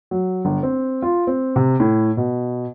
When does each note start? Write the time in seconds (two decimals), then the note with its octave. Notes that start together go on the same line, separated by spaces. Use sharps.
0.11 F#3
0.45 G1
0.63 C4
1.02 F4
1.27 C4
1.56 C3
1.80 A2
2.17 B2